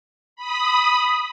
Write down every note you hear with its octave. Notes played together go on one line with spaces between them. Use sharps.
B5 D#6